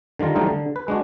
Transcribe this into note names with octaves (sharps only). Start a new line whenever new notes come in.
D3 D#3 G3 F4 A#5
E3 F#3 G3 A3 D#4 A#4
D3
B4
G#3 D4 F#4